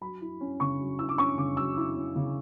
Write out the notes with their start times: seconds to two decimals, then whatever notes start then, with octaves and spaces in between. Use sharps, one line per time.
0.01 F#3 B5
0.21 E4
0.41 C#4
0.60 C#3 C#6
0.79 F#3
0.99 E4 E6
1.09 D6
1.18 C#4 C#6
1.38 C#3 D6
1.57 F#3 E6
1.77 E4
1.96 C#4
2.15 C#3